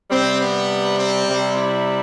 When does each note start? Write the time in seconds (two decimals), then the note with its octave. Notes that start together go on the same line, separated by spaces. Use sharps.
0.11 C3 G3 C4
0.40 B3
0.98 C4
1.27 C3 G3
1.56 E4